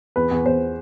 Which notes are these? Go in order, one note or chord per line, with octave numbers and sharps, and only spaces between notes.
E2 B4
E2
E2 C5